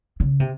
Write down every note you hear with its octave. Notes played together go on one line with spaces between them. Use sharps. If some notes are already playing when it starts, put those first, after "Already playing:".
C#3
C3